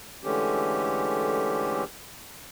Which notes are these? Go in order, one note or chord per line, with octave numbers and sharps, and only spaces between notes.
D3 E3 G#3 A3 C#4 G4